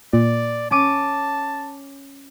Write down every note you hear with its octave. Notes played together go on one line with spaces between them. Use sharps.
A#2 D5
C#4 A5 D6 D#7